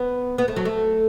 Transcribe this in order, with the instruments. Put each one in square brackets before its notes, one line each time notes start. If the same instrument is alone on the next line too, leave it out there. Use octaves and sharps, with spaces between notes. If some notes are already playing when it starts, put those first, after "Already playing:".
Already playing: [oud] B3
B3
A3
F#3
A3